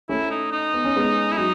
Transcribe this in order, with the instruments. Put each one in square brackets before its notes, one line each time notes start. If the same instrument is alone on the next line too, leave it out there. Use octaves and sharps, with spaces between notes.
[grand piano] A3 C#4 [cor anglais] E4
[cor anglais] D#4
D#4
[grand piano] B3
C#4
G#3 B3
[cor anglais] E4
[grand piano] F#3 [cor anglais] D#4